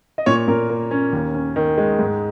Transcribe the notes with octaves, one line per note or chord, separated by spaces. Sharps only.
D#5
A#2 C#5
A#2 A#4
A#3
C#4
D#2
C#4
D#3
G#3
G#2